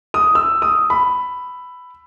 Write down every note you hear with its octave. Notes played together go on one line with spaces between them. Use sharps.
D#6
E6
D#6
B5